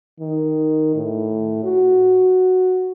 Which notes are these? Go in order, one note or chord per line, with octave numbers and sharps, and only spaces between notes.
D#3
A2
F#4